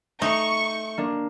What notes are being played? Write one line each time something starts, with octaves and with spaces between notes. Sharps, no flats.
A3 D#4 C#6
A#3 D4